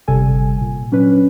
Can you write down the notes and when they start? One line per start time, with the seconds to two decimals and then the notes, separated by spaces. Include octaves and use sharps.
0.08 G1 C3 G3 A4 G#5
0.61 A#2
0.92 F#3 C#4 D4 B4